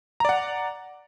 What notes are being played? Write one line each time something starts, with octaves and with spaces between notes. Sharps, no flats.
D5 F#5 A#5